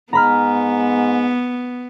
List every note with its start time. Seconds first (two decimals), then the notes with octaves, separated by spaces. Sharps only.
0.13 G#2 B3 A#5 B5 F6